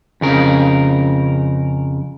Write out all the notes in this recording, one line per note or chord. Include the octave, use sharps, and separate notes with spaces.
F2 C#3 A#4